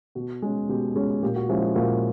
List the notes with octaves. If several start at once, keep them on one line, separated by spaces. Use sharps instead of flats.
B2 F#4
G#3 C#4
B2 G4
G#3 C#4 G#4
A#2 G4
F#4
F3 G#3 C#4 E4 G4
F#4
A#2 F#4